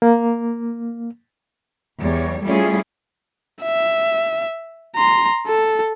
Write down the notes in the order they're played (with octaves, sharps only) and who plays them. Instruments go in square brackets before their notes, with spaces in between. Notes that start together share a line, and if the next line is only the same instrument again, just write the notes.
[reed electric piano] A#3
[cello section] E2 G3 C#5
G3 A3 C#4 E4 F4 G#4
[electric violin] E5
A#5 C6
A4